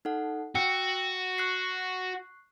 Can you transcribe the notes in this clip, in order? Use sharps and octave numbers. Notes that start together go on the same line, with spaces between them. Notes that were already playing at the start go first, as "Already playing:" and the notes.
D#4 A4 F#5
F#4 G5 E6
C#6 F#6 C7